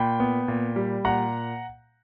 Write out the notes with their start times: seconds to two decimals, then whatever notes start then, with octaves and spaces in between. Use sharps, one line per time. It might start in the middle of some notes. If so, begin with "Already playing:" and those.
Already playing: A#2 G5 B5
0.20 B3
0.48 A#2
0.76 G3
1.05 A#2 F#5 A#5